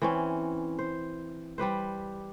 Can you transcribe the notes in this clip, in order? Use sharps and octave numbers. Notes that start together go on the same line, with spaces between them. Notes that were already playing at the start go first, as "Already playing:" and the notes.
E3 C4 C#4
C5
G3 G4 B4 C5